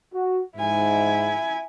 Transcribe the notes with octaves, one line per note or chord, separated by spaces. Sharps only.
F#4
G#2 E4 G#5